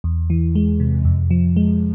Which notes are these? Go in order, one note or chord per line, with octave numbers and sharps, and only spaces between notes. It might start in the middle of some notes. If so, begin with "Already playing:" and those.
E2
E3
G#3
C3
F2
F3
G#3